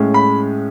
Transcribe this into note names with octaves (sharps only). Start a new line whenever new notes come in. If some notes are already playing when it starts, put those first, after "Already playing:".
Already playing: A2 G#3 C#4
B5